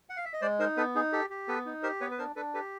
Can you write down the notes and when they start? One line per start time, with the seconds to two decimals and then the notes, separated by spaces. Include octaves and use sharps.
0.09 F#5
0.17 F5
0.25 E5
0.33 D#5
0.41 G#3 C5 D5
0.59 D#4 A#4 C5
0.77 B3 A4 B4
0.95 D#4 G#4
1.13 G4 A4
1.30 G4
1.48 B3 A4 B4
1.66 D#4
1.83 G4 A#4 C5
2.01 B3 B4 C#5
2.11 B4
2.18 D4 A#4 C5
2.36 D4 A4 B4
2.54 G4 A4 B4